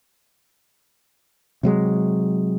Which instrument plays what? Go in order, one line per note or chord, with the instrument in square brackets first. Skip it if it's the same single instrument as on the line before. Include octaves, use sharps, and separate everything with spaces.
[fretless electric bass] C3 F#3 G#3